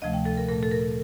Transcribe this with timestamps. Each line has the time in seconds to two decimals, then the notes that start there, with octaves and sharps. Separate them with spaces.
0.02 D2 C3 F3 A3 D#5
0.13 G5
0.25 A4
0.37 A#4
0.48 A#2 A3 A#4
0.63 A4
0.71 A#4